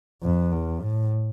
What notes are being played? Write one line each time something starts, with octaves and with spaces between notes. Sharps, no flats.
F2
E2
A2